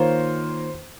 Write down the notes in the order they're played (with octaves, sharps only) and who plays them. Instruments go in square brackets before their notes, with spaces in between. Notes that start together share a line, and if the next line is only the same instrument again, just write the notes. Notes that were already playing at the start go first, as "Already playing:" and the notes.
Already playing: [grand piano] D#3 A#3 F4 A#4 C#5 [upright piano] C5